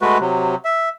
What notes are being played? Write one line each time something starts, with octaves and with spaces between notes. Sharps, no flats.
G#3 A3 F#4 B4
C3 F#3
E5